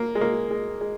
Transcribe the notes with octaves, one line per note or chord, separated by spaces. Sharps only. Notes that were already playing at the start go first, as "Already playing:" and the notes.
Already playing: A#3
G#3
A#3
G#3
G#3